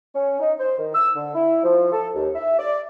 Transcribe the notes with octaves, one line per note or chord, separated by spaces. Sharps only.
C#4
D#4
C5
D#3
E6
D3
E4
F3
A4
D#2
E5
D5